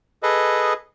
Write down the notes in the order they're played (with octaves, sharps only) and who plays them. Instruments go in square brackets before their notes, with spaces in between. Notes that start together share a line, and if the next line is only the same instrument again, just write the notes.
[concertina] G#4 A4 B4 D#5